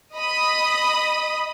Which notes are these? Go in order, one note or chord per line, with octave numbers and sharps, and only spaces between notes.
D#5 B5 D#6